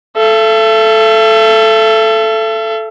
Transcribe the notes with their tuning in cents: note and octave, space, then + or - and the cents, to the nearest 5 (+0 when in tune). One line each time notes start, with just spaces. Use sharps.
A4 -5 E5 +45